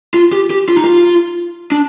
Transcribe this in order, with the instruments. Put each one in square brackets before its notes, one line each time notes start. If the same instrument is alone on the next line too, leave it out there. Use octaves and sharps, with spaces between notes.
[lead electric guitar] F4
G4
G4
F4
D#4
F4
D4